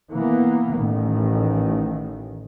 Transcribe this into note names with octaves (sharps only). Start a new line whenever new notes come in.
E3 A#3 B3
A1 D#3